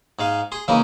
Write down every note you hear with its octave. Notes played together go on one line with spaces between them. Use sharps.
G#2 G#3 F5
G#4 C6
C#3 E3 G#3 A#3 D#4